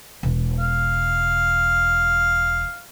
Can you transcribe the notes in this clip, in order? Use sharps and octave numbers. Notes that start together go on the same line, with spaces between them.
E1
F5